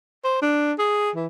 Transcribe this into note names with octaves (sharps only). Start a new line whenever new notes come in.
C5
D4
G#4
E3